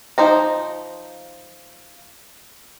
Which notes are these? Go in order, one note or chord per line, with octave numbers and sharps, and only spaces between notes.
F3 D#4 C5 A#5